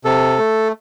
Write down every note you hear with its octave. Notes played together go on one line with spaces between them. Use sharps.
C3 A4
A3